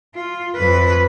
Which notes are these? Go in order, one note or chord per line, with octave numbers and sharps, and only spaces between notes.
F4
F2 B4